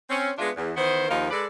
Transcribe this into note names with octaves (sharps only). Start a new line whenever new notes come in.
C4 C#4
G#3 B3 D4 F4 E5
E2
D#3 E3 B3 C5
D#2 F3 A#3 D#4 F4
G#3 A4 B4 D5